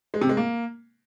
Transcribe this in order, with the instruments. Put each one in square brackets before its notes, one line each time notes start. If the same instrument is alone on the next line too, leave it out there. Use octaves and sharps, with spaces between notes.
[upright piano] G#3
C3
G#3
A#3